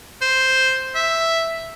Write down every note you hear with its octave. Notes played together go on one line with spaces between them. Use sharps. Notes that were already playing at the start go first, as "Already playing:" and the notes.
C5
E5